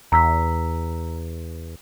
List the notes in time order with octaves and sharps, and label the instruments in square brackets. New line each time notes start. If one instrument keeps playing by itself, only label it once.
[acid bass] E2 [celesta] A#5 E6 B6